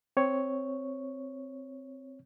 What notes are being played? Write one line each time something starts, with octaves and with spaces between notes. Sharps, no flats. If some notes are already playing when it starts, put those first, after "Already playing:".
C4 C#5